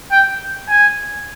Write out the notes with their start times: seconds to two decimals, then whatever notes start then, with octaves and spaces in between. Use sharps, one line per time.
0.12 G5
0.69 G#5